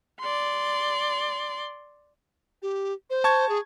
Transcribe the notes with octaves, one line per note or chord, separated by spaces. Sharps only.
D5 C6
G4
C5
A5 C#6 G#6
G#4